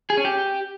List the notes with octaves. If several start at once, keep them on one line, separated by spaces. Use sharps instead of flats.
G#4
C#4
G4